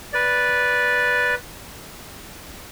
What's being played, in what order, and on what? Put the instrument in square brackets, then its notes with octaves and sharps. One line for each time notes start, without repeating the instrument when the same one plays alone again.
[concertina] B4 D5